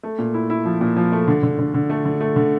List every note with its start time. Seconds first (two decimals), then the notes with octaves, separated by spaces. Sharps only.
0.03 A3
0.19 A#2
0.34 E4
0.50 E4
0.65 F3
0.81 A#2
0.97 F3
1.12 A3
1.28 D3
1.43 D3
1.59 D3
1.74 D3
1.90 A3
2.05 D3
2.21 A3
2.36 D3